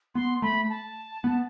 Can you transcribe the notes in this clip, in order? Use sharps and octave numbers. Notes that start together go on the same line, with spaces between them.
B3 C6
A3 B5
A5
B3